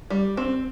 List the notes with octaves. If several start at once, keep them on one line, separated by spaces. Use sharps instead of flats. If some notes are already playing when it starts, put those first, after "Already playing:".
G3
C4